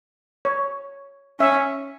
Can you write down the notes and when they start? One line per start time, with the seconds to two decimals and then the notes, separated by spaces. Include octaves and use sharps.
0.45 C#5
1.40 C#4 E5